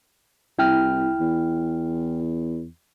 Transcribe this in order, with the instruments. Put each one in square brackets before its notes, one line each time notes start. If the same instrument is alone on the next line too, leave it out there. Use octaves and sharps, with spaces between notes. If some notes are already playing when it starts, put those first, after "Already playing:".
[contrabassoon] C2 [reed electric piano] E4 G5 F6
[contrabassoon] E2